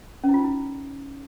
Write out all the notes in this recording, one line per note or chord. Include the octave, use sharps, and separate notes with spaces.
C#4
E4
F4
D#4
E4